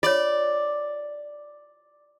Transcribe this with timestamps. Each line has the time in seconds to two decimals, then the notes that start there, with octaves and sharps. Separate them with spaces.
0.03 F4 C#5 D5